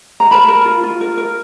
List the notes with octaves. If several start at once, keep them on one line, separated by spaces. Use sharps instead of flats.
A#5
A#4 A5 B5
A#4
F4
F4
A#4
A#4